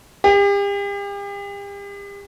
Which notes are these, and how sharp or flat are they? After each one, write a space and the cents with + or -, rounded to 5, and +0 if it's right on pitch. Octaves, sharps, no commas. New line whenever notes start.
G4 +40